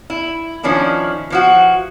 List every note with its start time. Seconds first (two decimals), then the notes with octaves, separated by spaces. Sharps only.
0.10 E4
0.63 D#3 F3 C#4 D4 E4
1.30 E3 F3 F#4